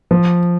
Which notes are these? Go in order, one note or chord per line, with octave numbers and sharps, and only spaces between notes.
F3